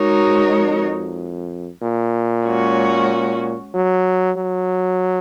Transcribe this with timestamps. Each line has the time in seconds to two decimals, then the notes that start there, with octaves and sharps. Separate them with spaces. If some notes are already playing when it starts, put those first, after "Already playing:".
Already playing: G#3 D#4 F#4 A#4 C#5
0.23 G#2
0.55 F2
1.83 A#2
2.46 G#3 C#4 F#4 C#5
3.74 F#3
4.37 F#3